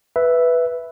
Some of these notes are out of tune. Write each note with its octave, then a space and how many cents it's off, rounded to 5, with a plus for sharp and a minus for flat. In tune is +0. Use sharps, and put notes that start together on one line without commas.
B4 +0 E5 +0